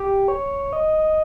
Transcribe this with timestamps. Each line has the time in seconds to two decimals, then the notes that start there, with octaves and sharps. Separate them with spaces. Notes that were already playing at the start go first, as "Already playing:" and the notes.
Already playing: G4
0.28 C#5
0.73 D#5